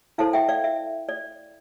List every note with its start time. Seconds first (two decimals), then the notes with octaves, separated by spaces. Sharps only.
0.18 E4 A4 C5 F5 A5
0.33 E5 G5
0.49 D5 F5
0.64 E5
1.09 D5